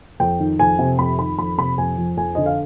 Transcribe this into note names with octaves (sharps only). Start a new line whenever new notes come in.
F2 G5
D#3
F2 G#5
C3
F2 B5
D#3 B5
F2 B5
C3 B5
F2 G#5
F3
F2 G#5
D3 D#5
F5